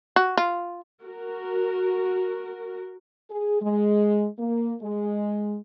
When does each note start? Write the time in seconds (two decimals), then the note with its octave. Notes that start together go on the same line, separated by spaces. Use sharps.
0.16 F#4
0.37 F4
1.02 F#4 A#4
3.30 G#4
3.61 G#3
4.39 A#3
4.81 G#3